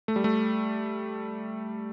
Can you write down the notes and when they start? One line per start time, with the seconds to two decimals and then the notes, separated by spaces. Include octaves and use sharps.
0.08 A3
0.16 G3
0.24 A3